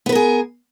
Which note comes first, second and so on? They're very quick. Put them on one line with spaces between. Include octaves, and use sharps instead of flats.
B3 B4 A#4 G#4